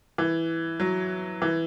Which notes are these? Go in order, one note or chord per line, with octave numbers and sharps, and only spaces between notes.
E3
F#3
E3